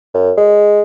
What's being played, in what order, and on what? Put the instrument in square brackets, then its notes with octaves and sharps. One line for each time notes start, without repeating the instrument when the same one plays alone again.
[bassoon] F#2
G#3